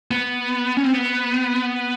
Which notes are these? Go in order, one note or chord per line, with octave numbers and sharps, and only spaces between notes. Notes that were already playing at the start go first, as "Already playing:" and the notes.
B3
C#4
C4
B3